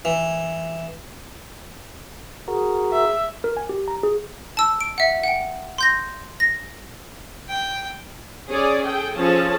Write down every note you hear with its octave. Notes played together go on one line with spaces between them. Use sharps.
E3
F#4 G#4 A#4
E5
A#4
G#5
G4
A#5
G#4
A5 E6
D7
E5 F#5
F#5 G5
C6 G6 A#6
A#6
G5
C#4 G#4 C#5 D5
G#4 A4 G5
F3 C#4 G#4 A4 C#5 A5